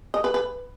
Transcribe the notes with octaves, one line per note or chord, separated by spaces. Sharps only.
D#5
B4
B4